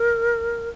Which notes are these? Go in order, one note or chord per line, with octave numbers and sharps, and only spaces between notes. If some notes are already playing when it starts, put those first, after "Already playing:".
Already playing: A#4